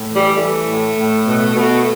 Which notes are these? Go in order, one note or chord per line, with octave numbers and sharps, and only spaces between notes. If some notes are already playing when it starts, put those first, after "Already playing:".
Already playing: A2
E3
G3
E3 A3
A2
A2
B2
B2